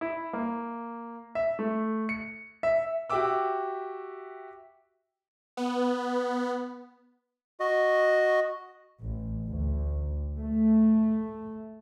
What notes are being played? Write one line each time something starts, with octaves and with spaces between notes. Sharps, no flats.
E4
A#3
E5
A3
C#7
E5
F#4 G4 E5 G5 D6 E6
B3
F#4 D#5
A1
D2
A3